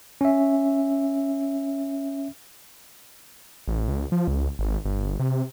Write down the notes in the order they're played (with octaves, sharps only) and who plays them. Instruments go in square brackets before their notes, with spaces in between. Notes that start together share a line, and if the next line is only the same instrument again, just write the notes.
[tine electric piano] C#4 E5
[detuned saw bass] A1
C#2
F3
C#2
G#1
G1
C3